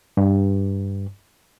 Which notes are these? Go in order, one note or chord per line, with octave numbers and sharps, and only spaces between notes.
G2